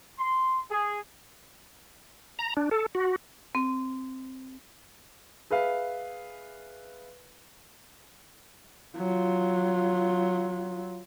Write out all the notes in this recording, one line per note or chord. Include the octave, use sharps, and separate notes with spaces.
C6
G#4
A#5
D4
A4
F#4
C4
G#4 B4 E5 F5
F#3 F4